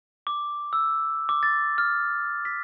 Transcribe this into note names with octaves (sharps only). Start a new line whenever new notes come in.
D6
E6
D6
A6
F6
B6